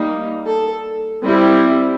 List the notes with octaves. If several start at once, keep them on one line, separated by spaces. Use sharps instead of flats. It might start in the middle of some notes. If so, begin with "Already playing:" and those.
Already playing: G3 A#3 D#4
A4
G3 C4 E4